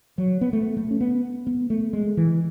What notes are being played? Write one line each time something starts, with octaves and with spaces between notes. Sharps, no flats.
F#3
B3
A3
A3
C#4
B3
B3
A3
G#3
E3